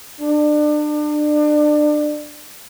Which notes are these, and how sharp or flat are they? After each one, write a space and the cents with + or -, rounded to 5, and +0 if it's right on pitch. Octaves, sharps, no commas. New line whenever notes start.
D4 +30